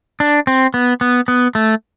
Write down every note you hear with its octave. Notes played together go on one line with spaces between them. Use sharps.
D4
C4
B3
B3
B3
A3